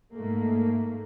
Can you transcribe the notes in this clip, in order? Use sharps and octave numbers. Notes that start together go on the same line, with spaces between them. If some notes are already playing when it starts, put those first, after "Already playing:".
G#2 A3 A#3